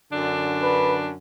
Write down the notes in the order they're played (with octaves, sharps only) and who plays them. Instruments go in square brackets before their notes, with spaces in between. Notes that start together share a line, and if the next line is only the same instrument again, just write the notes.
[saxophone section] F#2 D3 D4
[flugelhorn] B4